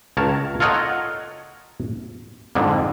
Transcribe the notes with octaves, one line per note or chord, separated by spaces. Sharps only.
C#2 A#4 C#5 A5
F4 A4 A#4 C#5 D#5 F#5
F2 G#2 D3